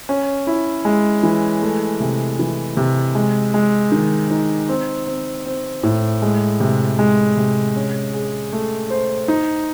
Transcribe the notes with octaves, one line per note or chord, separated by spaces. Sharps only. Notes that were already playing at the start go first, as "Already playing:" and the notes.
C#4
E4
G#3
E3
A3
C3
E3
C3
G#3
G#3
D#3
D#4
C4
C4
C4
A2
G#3
C3
G#3
C3
C#4
G#4
A3
C5
D#4